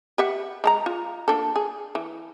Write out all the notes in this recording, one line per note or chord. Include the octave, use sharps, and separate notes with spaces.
G4 E5 F#5
G#3 A5 A#5
F4
A#3 D4 A4
G#4
E3